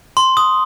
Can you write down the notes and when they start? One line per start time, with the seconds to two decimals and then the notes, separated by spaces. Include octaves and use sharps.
0.17 C6
0.37 D#6